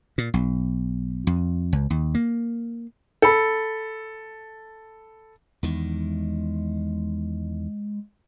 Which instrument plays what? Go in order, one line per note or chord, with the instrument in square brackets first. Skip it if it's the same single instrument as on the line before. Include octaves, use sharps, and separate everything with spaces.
[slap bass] A#2
B1
F2
C#2
D#2
A#3
[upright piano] A4 B5
[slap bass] E2 D#3 [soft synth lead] G#3